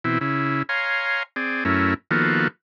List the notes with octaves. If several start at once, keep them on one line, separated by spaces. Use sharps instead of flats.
B2 E3 C4 E4
C#3 E4
C#5 F5 G#5 A#5 C6
C4 G#4 D5
F#2 A3 C#4 E4 A#4
D#3 F3 A#3 B3 F#4 A4